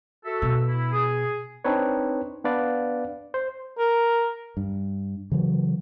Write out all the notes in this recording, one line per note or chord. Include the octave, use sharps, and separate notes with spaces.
F#4 A4 E5
B2
E4
G#4
C4 D4 D#4 B4 C#5
B3 D4 B4 D5 F5
C5
A#4
G2
C#3 E3 F#3